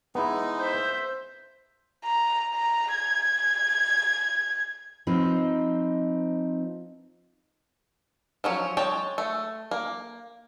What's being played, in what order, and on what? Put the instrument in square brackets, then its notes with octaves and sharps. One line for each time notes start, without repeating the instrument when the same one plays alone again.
[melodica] G#3 D#4 [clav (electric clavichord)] B3 E4
[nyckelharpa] C5 E5 [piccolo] G6
[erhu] A#5
A#5
G#6
[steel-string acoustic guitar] F3 C4 D#4 B4
[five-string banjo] F3 F#3 C#4
G#3 C#5 G5 A5
A3
A#3